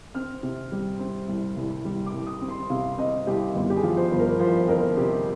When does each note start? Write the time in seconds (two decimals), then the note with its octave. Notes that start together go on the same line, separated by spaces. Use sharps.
0.15 C4 F6
0.43 C3
0.72 G3
0.99 C4
1.28 C2
1.56 C2
1.85 G3
2.06 D6
2.13 C2
2.27 D#6
2.41 C4
2.48 C6
2.70 C3 F5
2.98 C4 D#5
3.27 C2 G4
3.55 G1
3.70 G4
3.76 G#4
3.83 F3
3.97 C5
4.11 G1
4.19 A#4
4.39 F3 C5
4.68 F2 A#4
4.97 C3 G4